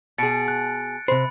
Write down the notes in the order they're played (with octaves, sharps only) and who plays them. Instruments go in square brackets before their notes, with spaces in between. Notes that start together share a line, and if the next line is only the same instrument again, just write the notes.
[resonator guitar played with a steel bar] B2 G#4 [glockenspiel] A6 C#7 D7
[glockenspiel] F#6
[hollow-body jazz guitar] C3 C5 [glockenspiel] B5